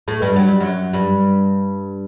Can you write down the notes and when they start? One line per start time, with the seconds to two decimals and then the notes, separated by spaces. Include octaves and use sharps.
0.08 A2 A3
0.22 G2 G3
0.36 F#3
0.48 G3
0.60 F#2 F#3
0.93 G2 G3